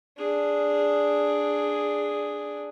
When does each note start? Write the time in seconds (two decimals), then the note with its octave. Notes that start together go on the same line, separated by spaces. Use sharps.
0.18 D4 G#4